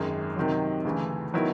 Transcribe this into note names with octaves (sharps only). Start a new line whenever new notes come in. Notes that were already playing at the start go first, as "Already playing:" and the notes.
Already playing: G#1 F#2 D#3 G#3
C3 D#3 F#3
D2 C#3 E3 A3
D#3 F#3 B3 E4